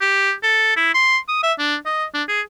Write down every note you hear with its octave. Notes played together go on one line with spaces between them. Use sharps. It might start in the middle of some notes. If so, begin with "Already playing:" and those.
G4
A4
E4
C6
D#6
E5
D4
D#5
D4
G#4